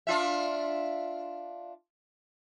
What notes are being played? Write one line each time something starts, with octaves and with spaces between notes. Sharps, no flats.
D4 F4 E5